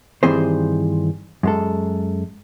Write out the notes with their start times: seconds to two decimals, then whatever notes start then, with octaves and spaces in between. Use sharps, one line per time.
0.23 G2 D#3 E3 C4 G#4 C5
1.43 F#2 G#3 A4